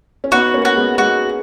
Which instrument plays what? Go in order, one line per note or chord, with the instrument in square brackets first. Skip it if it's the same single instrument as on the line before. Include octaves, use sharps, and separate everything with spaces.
[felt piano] C#4
[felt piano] B3 D#4 [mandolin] F#4
[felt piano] A#3 C#4
[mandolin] F#4
[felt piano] G#3 B3
[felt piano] G#3 [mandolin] F#4